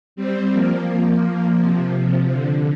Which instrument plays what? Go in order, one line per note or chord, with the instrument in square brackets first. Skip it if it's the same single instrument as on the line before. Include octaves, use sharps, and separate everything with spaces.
[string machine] G3 C4
F3 A#3
C3 F3
C3 F3
D3